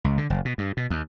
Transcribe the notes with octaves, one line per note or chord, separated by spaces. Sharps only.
C#2
D3
F#1
B2
G2
B2
D#2